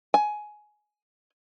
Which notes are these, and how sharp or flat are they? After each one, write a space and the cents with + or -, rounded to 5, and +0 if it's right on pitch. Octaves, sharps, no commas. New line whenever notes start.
G#5 +15